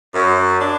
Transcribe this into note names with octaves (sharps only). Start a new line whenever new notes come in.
F#2
D4